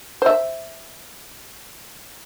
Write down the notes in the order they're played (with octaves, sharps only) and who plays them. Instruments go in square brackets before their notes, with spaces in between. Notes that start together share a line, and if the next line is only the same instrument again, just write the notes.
[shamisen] C5 E5